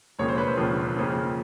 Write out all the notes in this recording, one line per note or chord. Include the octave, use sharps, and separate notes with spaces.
E1 D#2 C#3 F3 A#3 C#5
C5
B4
C5
E1 D#2 C#3 F3 A#3
F2 C#3 F3 A#3 C#4